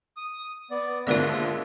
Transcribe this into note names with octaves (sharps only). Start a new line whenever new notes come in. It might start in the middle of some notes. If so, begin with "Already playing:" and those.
D#6
B3 D5
D#2 G#2 D3 F4 A#4 D5 E5